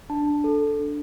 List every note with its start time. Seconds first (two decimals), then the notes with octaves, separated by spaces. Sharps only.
0.10 D4 A5
0.44 A4
0.80 D4